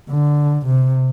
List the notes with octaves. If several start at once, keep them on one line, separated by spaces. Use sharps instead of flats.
D3
C3